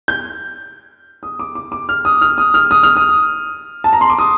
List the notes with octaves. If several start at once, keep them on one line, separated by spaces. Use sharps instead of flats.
G6
D#6
D6
D6
D6
F6
D#6
F6
D#6
F6
D#6
F6
D#6
A5
A#5
C6
D6
D#6